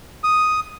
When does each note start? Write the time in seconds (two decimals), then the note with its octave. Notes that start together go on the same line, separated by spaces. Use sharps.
0.24 D#6